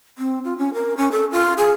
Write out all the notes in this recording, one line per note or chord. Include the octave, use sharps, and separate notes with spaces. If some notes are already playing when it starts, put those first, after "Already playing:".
C4
F4
C#4
A#4
C#4
A4
F4
G#4